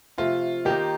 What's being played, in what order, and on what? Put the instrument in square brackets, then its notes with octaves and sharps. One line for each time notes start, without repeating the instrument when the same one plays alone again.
[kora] C3 F3 A3 [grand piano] F4
[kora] D#3 A#3 D#4 [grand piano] G4